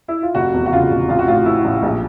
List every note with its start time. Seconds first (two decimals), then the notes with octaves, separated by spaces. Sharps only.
0.08 E4
0.22 F4
0.35 F1 F#4
0.54 E2
0.66 F#4
0.72 C#3 F4
0.90 F1
1.09 A1 F4
1.19 F#4
1.27 A2 F4
1.46 F3 E4
1.65 A1
1.83 A#1